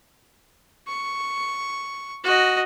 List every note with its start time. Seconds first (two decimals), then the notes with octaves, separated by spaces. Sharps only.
0.88 C#6
2.24 F#4 D#5